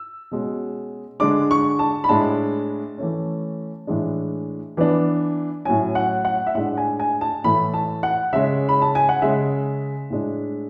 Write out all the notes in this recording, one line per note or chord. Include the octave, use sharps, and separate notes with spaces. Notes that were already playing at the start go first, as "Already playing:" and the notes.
Already playing: E6
B2 G#3 C#4
D3 G#3 D4 D6
C#6
A5
B5
A2 G#3 D4 A5
E3 A3 C#4
A2 E3 G#3 D4
E3 B3 D4
A2 F#3 C#4 G#5
F#5
F#5
E5
A2 G#3 D4 F#5
G#5
G#5
A5
A2 E3 A3 B5
A5
F#5
C#3 G#3 C#4 E5
B5
A5
G#5
F#5
C#3 G#3 C#4 E5
A2 G#3 D4